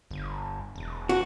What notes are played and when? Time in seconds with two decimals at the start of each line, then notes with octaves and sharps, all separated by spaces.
0.11 G1
0.76 E1
1.09 F#4